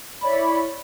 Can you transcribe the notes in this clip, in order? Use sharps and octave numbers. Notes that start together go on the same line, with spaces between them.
E4 C#5 D5 B5